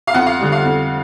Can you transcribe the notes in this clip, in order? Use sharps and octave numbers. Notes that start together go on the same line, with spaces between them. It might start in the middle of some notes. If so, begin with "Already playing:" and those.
F5
F2 F#5
F5
D3 G3
F5
F2